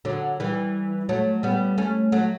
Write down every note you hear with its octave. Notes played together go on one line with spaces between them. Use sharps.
D3 F#3
E3 G3
F#3 A3
G3 B3
A3 C#4
F#3 A3